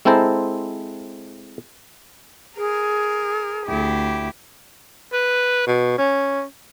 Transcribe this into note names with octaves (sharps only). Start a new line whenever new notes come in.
G#3 C4 E4 A4 C5 A#5
G#4 A#4
D2 E4 G4
B4
B2
C#4